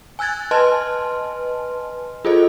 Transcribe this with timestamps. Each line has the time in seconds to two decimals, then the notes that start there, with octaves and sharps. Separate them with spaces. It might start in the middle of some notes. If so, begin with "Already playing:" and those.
0.19 G#5 E6 F#6 G#6 A6
0.51 B4 D#5 G#5 A5 C6 F6
2.25 F4 G#4 A4 C5 D#5